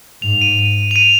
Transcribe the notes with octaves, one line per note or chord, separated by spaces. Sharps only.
G#2 F7
D#7
D#7
F7
D#7